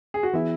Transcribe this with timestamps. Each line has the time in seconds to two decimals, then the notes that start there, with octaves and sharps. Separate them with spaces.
0.14 G#4
0.23 F#4
0.33 E3 B3 E4 G#4 E5